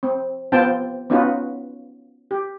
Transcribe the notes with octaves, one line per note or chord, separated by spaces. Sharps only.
C4
B3 C4 F4 C5 G5 A5
B3 C#4 D#4 F4 F#4 B4
G4